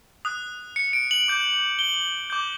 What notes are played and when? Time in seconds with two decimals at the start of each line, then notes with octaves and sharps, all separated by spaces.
0.25 D#6 F#6
0.76 C#7
0.93 D7
1.11 F#7
1.28 D6 G6
1.79 G7
2.30 D6 G6